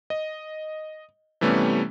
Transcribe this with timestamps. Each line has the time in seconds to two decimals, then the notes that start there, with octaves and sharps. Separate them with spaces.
0.10 D#5
1.41 C3 E3 G3 A3 B3 C#4